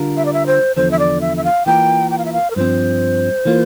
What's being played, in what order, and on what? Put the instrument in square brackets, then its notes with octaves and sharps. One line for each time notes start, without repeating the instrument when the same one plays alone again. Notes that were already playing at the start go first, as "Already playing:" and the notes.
Already playing: [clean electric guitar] D3 G3 D4 F4 A#4
[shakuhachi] E5
D5
E5
C5
[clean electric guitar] E2 D3 F3 [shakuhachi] C5
[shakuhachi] E5
D5
E5
E5
F5
[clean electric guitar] E3 A#3 F4 A#4 [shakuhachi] G5
[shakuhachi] G5
F5
E5
F5
A#4
[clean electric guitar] G2 F3 C4 [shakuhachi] C5
[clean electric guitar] E3 A#3 F4